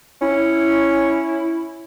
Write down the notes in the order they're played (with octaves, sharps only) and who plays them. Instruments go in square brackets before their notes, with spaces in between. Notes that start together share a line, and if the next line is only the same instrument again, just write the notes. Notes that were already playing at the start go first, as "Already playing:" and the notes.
[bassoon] C#4 [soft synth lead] E4